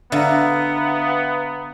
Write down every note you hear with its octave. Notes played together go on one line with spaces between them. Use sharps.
D3 B3 E5 F5 A#5